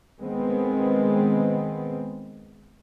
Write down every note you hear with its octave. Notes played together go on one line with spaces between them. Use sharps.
D#3 G#3 B3 C4